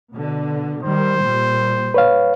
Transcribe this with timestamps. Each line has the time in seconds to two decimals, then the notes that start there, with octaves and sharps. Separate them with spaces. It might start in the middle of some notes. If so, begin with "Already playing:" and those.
0.14 B2 D3
0.83 D#3 G3 C5
1.20 A#2 G3
1.94 B4 C#5 F5